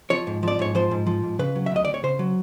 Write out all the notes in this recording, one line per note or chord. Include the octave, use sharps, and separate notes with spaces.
F3 C#5
G#2
F3 D5
G#2 C#5
F3 C5
G#2
F3
G#2
C#3 B4
F#3
E5
D2 D#5
D2 D5
C#5
C#3 C5
F#3